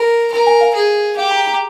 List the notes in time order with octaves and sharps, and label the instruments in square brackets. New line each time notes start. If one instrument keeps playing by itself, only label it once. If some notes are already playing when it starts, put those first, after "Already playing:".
Already playing: [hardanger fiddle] A#4 [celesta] A#5
[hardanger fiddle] A#4 [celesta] A#5
[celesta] G#5
F5
[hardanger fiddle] G#4
[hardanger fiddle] G4 [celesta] F5
[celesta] A#5
A#5